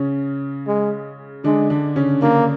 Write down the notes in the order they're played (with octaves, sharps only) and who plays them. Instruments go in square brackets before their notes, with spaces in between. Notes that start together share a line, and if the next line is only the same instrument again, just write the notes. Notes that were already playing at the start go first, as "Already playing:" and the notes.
Already playing: [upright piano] C#3 C#4
[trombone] G#3
[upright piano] D3 D4 [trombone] G#3
[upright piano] D3 D4
C#3 C#4
[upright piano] D3 D4 [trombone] A#3